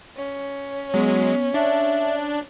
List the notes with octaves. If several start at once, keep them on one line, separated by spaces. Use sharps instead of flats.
C#4
F#3 G#3 B3
D4 E5